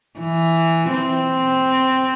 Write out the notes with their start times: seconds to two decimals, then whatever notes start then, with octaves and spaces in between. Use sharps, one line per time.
0.20 E3
0.92 C4